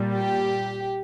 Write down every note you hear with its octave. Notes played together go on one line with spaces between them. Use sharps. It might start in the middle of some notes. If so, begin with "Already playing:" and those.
Already playing: A#2 G3
G4